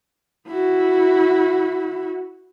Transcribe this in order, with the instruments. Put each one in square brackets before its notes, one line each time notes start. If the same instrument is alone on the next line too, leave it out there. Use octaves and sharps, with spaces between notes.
[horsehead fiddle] E4 F#4